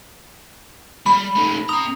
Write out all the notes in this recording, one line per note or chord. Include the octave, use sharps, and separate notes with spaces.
G3 B5
A3 D#4
C4 A#5 D#6